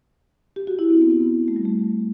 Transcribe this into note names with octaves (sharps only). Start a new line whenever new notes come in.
G4
F#4
E4
C4
B3
C4
B3
A3
G3
A3